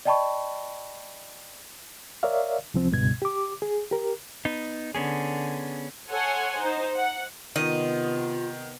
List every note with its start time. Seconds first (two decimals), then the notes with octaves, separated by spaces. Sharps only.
0.05 D5 D#5 G5 A5 B5 C#6
2.23 A#4 C#5 D5 E5 F5
2.74 C2 F3 C4
2.92 C#2 G2 B2 G#6
3.22 G4 D6
3.62 G#4
3.91 G4 A#4
4.45 B3 D#4
4.95 D3 B3 C#4 G#4
6.10 A4 C#5 F#5 G#5 C6
6.57 D#4 C5
6.96 F#5
7.56 C3 D#3 B3 F4 D#5